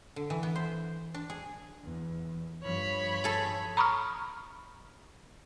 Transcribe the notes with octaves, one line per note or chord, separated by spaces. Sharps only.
D3
E3
B3
C5
D4
G#4
E2
G2 F3 C#5 B5
G#4 A4
A#5 B5 C#6 D#6 F6